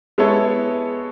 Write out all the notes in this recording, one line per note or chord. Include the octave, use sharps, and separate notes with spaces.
G#3 B3 E4 A4 C#5